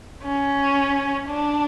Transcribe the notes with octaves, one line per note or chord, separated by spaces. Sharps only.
C#4
D4